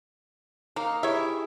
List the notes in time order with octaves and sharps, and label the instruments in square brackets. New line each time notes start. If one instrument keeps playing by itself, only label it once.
[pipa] A#3 [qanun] D#4 F5
[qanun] E4 G4 G#4 [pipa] C#5 E5